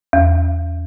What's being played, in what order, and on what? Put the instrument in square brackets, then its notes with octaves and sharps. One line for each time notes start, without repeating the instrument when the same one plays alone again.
[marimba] E2